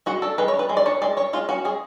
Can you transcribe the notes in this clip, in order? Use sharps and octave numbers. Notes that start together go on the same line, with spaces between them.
G#3 F#4
D4 A4
G#3 B4
C#5
D4
B4
G#3
D5
D4 C#5
G#3 D5
D4 C#5
G#3 F4
C#4 F#4
G#3 G#4